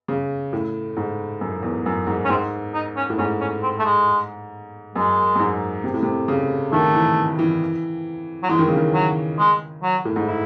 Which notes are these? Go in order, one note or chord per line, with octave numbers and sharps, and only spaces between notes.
C#3
A2
G#2
F#2
E2
F#2
G#2
C#4
G#2 C4
D#4
C#4
A2
G#2 C#4
C#4
C4
A3
G#3
F#2 G#3
F#2
G#2
C3
A2
C3
C#3
D#3 A3
E3
E3
F#3
E3 G#3
D#3
C#3
D#3
F#3
G#3
F#3
A2
G#2
E4